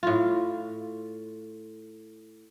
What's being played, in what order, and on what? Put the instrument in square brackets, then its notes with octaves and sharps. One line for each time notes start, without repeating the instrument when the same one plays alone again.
[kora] A2 F4